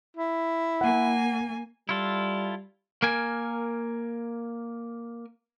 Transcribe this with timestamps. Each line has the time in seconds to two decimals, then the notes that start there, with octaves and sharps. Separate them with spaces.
0.17 E4
0.81 A#3 F#5 G#5
1.89 G3 E4 F4 A4
3.03 A#3 A#4 G#5